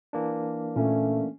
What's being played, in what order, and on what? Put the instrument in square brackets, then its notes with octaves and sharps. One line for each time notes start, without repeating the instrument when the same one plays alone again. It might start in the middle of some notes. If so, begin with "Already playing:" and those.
[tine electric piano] E3 A#3 D4
[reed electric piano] A#2 [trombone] A3 [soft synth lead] C#4